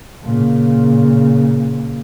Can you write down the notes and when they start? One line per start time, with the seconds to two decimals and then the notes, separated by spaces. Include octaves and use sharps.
0.22 A#2 C#3